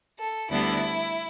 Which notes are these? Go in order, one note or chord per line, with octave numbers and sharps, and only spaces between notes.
A4
D2 D3 G3 B3 D4 E4